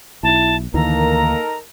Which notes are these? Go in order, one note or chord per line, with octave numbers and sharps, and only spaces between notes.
B1 E4 A5
D2 D#3 E3 A#3 D#4 A4 A#4 A#5